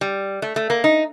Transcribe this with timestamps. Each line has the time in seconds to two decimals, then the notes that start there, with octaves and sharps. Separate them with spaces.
0.01 G3
0.42 A3
0.56 A3
0.70 A#3
0.84 D#4